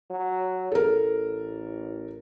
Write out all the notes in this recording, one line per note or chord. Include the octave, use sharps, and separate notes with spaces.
F#3
A1 A4 A#4